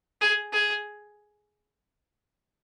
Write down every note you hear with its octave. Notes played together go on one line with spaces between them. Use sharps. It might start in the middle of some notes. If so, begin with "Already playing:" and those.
G#4
G#4